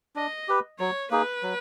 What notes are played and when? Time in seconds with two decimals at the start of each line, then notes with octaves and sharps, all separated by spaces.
0.16 D4 D#5
0.48 G4 B4
0.79 F#3 C#5
1.11 A#3 D#4 G#4 B4
1.43 F#3